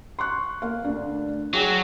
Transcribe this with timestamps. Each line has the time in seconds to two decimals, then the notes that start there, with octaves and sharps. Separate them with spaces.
0.19 C6 C#6 F#6
0.62 A#3 F5
0.85 D2 D4
1.53 F#3 G#4 G5